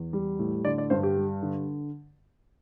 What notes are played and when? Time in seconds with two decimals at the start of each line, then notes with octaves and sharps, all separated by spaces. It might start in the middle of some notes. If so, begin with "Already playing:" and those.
Already playing: E2
0.13 G3
0.39 A2
0.64 D3 D5
0.78 D5
0.90 G2 C5
1.03 G4
1.17 G3
1.42 D3